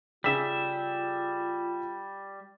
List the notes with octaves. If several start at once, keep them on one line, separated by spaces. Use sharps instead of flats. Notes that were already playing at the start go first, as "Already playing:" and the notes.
C#3 G3 F4 G#4 E5 B6